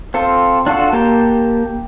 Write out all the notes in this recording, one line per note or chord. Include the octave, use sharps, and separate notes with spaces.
C4 F4 A4
D4 F4 F#4 A4
A#3 G4 A5